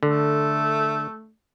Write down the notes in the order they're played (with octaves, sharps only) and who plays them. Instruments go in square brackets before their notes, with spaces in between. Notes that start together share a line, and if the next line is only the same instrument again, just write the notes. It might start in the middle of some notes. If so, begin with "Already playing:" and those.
[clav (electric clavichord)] D3 [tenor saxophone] A3